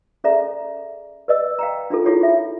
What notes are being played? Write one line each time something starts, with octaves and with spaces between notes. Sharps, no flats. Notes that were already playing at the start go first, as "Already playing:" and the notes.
C#4 G#4 A4 D5 E5 A#5
B4 D5 D#5 E6
F5 G5 A#5
D4 D#4 F4 A4
E4 F4 G#4 A4 C#5 F#5
E5